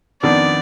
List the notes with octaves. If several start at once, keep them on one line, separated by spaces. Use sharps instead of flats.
F2 D#3 B3 D4 D5